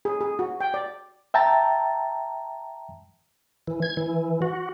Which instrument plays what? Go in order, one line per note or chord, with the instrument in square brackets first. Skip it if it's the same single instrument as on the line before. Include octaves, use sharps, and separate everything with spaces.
[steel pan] G#4
G#4
F#4
G5
D5
[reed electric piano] E5 G5 A5 A#5 A6
[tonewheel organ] E3
G#6
E3
F#4